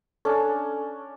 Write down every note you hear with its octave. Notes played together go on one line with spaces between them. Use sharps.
C#4 D4 A4